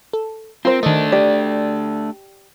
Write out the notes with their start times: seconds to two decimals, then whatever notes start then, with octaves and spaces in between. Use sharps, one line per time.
0.13 A4
0.65 C4 F4 A#4 C5
0.83 D#3 A3 D4 D#5
1.12 G4 D5